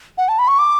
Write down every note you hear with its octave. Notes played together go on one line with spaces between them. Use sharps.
F#5
A5
B5
C#6
D6